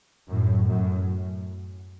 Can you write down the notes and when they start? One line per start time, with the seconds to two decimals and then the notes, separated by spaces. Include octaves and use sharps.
0.28 F#2 A2
0.66 F#2 A2